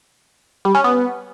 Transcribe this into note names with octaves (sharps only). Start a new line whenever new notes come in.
G3
C#4
B3